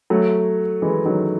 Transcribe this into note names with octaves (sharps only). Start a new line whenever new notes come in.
F#3 A3
E3 G#3
D#3 F#3